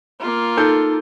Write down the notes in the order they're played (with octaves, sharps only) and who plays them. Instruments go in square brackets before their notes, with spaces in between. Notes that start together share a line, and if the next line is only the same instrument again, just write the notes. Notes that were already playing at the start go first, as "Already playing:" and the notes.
[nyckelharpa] A#3 F4
[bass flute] D#4 [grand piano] A4 G6